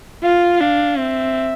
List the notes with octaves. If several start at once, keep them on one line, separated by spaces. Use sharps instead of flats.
F4 F5
D4 F5
C4 E5